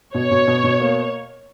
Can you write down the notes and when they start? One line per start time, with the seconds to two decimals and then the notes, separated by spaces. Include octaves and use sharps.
0.15 B2 C#5
0.31 B2
0.48 B2
0.64 B2
0.80 A#3